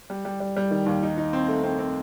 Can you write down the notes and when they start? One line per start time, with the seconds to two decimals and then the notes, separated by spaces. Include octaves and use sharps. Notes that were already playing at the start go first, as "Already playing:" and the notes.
0.10 G3
0.25 G3
0.40 G3
0.57 G3
0.71 D#3
0.86 D#2
1.03 D#4
1.17 D#4
1.33 C4
1.48 A3
1.63 C4
1.79 C4